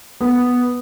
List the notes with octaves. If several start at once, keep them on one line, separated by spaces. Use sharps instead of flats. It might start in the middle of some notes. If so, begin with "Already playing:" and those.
B3